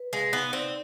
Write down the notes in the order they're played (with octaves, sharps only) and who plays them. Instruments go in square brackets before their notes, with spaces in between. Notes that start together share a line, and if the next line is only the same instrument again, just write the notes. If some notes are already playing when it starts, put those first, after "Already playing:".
Already playing: [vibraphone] B4
[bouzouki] G#3 [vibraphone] F5
[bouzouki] B3 [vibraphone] D#4
[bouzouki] C4 [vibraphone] D5